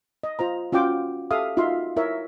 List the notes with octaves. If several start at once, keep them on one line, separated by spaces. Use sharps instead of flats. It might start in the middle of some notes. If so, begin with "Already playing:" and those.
D#5
F4 C5 A#5
C#4 F4 F#4 G5 D6
G4 A4 E5 F5 D#6
D#4 F4 F#4 E5 F5 C6
E4 A#4 C#5 E5